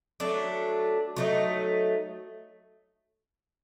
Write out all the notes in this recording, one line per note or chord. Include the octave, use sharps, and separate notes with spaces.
F#3 A3 D4
F#3 A3 D#4